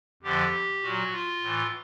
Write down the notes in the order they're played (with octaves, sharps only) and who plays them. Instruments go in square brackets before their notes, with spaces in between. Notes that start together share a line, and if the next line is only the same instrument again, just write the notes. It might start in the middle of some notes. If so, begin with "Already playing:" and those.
[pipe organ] F2 D3 F3 G4
A#2 F#3 F#4
F4
A2 E3